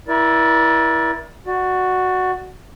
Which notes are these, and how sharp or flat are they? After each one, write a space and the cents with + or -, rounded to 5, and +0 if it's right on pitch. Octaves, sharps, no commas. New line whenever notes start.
E4 +0 A#4 +40 D5 +0
F#4 +0 D5 +20